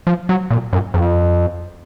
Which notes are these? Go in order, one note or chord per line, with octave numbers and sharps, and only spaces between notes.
F3
F#3
A#2
F#2
F2